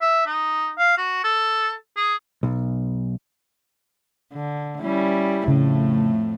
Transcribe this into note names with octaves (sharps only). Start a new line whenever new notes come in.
E5
D#4
F5
F#4
A4
G#4
B1
D3
G3 C#4 E4
F2 A2 C#3 A3